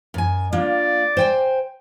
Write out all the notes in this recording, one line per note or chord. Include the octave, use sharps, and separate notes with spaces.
F#2 G#5
A#3 D4 F4 D5
C5 G5 G#5